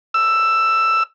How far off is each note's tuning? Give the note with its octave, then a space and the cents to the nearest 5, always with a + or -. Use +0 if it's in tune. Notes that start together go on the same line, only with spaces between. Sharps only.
E6 +10